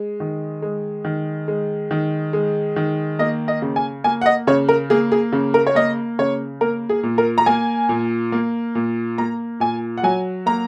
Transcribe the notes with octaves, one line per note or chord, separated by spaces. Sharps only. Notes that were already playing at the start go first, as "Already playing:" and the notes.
Already playing: G#3
D#3
G#3
D#3
G#3
D#3
G#3
D#3
A#3 D#5
D#5
C#3
G#5
A#3 G#5
F#5
D#5
C#3 C#5
A#4
A#3 G#4
G#4
C#3
A#4
C#5
A#3 D#5
C#3 C#5
A#3 A#4
G#4
A#2
A#4
A#5
A#3 G#5
A#2
A#3
A#2
A#3 A#5
A#2 G#5
F#5
F#3 G#5
A#3 A#5